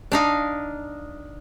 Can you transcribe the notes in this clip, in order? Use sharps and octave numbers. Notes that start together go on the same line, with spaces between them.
D4 D#4 F5